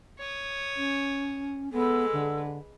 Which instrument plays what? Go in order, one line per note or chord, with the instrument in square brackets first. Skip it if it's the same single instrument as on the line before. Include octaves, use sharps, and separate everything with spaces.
[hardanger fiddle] C#5 D#6
[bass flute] C#4
[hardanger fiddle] G#3 B4 [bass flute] B3 [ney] A4
[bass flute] D3